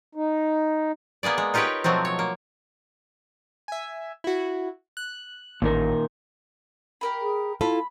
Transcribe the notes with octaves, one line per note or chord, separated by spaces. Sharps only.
D#4
A#3 B3 G#4 D5
G#3
D#4 F4 G4 A#4 B4 C#5
B2 F3 F#3 A3 C4
C#5
A#3
E5 G#5
E4 F#4
F#6
A1 D#2 A#2 D#3 A#4
G4 A#4 B5
G#4
E4 F4 A4 B5